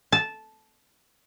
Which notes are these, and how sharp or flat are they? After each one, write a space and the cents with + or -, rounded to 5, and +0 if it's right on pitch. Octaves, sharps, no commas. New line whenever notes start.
A5 -10